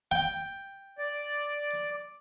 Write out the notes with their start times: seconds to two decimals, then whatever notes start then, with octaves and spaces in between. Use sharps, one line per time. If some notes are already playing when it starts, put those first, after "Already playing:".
0.11 G5
0.98 D5